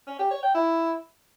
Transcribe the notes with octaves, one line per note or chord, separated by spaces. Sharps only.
C#4
G4
C#5
G5
E4